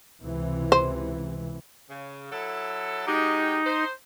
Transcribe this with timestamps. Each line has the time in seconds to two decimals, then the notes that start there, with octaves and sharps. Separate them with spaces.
0.22 C#2 C3 E3
0.72 C5
1.89 C#3
2.32 F#3 E4 A4
3.06 G#3 D#4 F#4 G4
3.65 C5